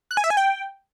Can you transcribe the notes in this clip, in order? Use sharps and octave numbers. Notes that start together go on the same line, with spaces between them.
F#6
G#5
E5
G#5
G5